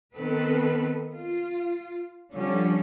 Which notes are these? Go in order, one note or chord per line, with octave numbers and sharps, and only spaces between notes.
D#3 B3 C4 A4 B4
F4
D3 F3 G3 C#4